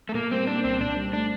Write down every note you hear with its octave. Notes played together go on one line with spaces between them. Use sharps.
A3
A#2 A#3
G3 C4
A#3 D4
C2 C4
A#2 D4
G3
A3 D4